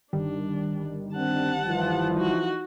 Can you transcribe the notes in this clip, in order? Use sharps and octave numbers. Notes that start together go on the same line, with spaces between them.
G1 D#3 G3 D4
C4 D4 F#5 A5
E3 F3
D#4 F#4